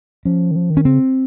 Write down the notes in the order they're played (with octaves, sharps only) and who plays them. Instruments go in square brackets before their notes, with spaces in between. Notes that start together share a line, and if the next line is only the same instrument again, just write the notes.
[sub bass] F3 [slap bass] C#4
[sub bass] D#3
F3
D#3
[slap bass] C#4
[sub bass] C#3 [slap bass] C4